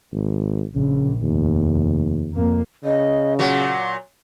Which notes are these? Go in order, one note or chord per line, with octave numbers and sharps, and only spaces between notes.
G#1
A#1 C#3
F1 D#2
F2 A#3
C#3 D#5
A#2 F#3 F#5